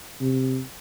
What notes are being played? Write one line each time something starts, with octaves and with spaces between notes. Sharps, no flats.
C3